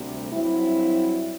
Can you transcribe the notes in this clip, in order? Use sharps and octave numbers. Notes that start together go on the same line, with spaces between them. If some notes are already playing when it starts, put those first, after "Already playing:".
Already playing: D2 C3 G3
G2 F#3 C4 E4